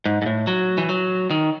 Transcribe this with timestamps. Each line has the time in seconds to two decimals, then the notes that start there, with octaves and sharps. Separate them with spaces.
0.06 G#2
0.22 G#2
0.26 A2
0.47 F#3
0.78 E3
0.89 F#3
1.31 D#3